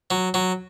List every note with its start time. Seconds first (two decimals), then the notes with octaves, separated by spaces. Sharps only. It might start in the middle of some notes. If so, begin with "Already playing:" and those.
0.11 F#3
0.34 F#3